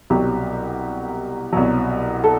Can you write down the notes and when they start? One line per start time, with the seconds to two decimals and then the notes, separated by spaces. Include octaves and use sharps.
0.10 C2 B2 F#3 G4
1.53 C2 B2 F#3
2.24 A4